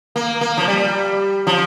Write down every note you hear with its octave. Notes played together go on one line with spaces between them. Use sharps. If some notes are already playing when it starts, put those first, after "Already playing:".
A#3
A#3
F3
G3
F3